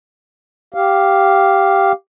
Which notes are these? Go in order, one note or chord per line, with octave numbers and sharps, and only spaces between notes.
G4 F5